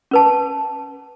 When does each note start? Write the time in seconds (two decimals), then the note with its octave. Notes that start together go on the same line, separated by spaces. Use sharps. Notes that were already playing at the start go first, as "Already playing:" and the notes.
0.11 C#4 B4 A5